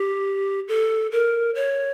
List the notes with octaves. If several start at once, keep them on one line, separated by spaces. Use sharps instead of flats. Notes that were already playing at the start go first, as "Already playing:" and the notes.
Already playing: G4
A4
A#4
C#5